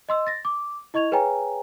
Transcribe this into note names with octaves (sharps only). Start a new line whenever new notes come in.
D#5 C6 E6
A6 A#6
D6
E4 D#5 C#6 G#6 F7
G#4 B4 C#5 G5 G#5 A#5